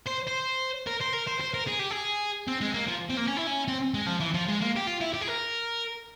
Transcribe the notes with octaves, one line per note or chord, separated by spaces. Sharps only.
C5
C5
A#4
C5
A#4
C5
C5
A#4
G#4
G4
G#4
C4
G#3
A#3
F3
C4
A#3
C#4
E4
C#4
C4
G#3
F3
E3
F3
G#3
A#3
G4
F4
E4
G4
G#4
A#4